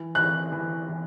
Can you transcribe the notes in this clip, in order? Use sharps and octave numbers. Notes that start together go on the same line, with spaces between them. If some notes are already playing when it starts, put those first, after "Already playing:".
Already playing: E3
E3 F#6
E3
E3